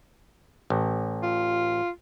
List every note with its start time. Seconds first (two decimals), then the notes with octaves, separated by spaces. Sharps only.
0.70 A1
1.23 F4